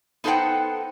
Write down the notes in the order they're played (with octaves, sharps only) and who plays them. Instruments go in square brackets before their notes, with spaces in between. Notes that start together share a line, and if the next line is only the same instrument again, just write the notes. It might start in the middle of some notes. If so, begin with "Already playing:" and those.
[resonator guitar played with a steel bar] B3 D#4 A4 C5 F#5 G5